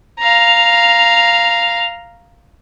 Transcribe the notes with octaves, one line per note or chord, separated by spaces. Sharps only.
F5 A#5